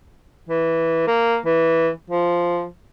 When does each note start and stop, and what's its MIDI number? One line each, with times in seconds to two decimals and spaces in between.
0.49 1.06 52
1.07 1.37 58
1.45 1.89 52
2.10 2.65 53